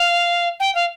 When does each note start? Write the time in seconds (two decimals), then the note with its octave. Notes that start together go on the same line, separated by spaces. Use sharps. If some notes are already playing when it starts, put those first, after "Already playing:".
Already playing: F5
0.60 G5
0.75 F5